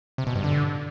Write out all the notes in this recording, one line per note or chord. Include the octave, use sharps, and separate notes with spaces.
C3
B2
G2
D3